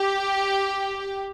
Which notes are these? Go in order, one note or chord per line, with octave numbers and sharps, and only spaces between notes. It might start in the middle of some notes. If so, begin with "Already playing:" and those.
Already playing: G4